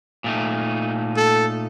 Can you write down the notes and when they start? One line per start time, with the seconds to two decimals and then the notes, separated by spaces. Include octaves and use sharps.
0.24 A#2 A3 D#4
1.17 A4